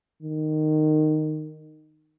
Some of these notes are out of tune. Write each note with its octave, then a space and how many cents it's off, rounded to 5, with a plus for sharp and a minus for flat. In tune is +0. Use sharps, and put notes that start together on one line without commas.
D#3 -10